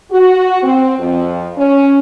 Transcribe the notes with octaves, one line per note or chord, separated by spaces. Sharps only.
F#4
C4
F2
C#4